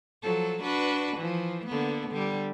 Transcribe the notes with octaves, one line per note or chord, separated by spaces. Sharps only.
F3 F#3 A4
D4 F#4 B4
E3 F3
D3 A#3 B3
D3 G3